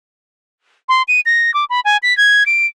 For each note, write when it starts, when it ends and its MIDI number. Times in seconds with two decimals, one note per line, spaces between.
0.89 1.02 84
1.08 1.20 99
1.26 1.53 94
1.54 1.65 86
1.70 1.80 83
1.85 1.97 80
2.03 2.16 95
2.17 2.43 92
2.46 2.66 98